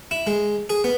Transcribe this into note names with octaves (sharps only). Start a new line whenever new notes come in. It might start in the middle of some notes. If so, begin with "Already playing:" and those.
E4
G#3
G#4
B3